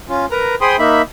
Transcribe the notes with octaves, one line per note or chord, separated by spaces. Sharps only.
C#4 F4
A#4 B4 A#5
G#4 C5 G5 B5 C6 D#6
A#3 D#4 E5 B5